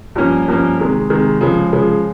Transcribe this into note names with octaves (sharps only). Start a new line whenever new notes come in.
G2 F3 A#3 C#4
G2 F3 A#3 C#4
C3 D#3 G#3
C3 D#3 G#3
C#3 F3 G#3
C#3 F3 G#3